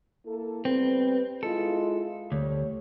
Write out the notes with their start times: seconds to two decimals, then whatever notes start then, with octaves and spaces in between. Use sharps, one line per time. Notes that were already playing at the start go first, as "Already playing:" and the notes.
0.26 A#3 E4 A4
0.65 G3 B3 C4 B4
1.43 G#3 E4 F4 A4
2.32 D2 G3 A4 C#5